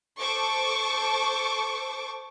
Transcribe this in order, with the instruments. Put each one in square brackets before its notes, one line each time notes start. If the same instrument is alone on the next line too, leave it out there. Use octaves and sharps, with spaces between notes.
[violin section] A4 C5 C#6 D6